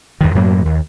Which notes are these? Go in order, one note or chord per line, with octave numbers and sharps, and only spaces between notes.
E2 G2 D#3
F#2 A2 F#3 A#3
D#2